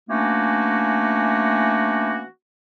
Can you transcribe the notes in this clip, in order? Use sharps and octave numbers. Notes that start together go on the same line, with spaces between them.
E3 A3 A#3 C#4 D4 F#4